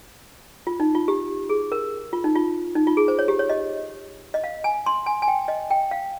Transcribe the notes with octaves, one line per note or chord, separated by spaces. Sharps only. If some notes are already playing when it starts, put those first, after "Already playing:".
F4
D#4
F4
G4
G#4
A#4
F4
D#4
F4
D#4
F4
G#4
C5
C#5
G4
C#5
D#5
D#5
F5
G#5
C6
G#5
G#5
G5
D#5
G5
F5